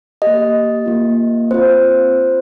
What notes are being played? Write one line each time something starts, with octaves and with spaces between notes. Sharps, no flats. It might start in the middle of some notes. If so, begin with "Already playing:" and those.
A#3 G4 D#5
A#3 F4
C4 F4 C5